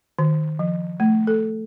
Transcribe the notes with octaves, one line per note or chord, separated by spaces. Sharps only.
D#3
F3
A3
A4